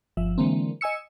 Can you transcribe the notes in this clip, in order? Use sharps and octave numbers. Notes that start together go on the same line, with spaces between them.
G1 F3 E5
D3 E3 G#3 A#3 C4
D#5 G#5 E6 C#7